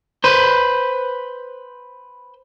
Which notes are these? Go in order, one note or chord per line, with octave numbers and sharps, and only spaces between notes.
B4 C5